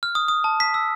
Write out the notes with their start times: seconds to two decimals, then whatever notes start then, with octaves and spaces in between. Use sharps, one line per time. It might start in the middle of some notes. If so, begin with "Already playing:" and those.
0.03 F6
0.15 D#6
0.28 D#6
0.44 A5
0.60 B6
0.74 E6